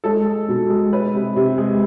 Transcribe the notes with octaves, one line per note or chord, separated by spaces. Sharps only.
G#3 A4
G#3
B2
G#3
G#3 B4
C3
C3
G#3